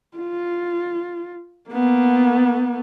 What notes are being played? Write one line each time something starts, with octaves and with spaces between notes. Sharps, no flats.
F4
A#3 B3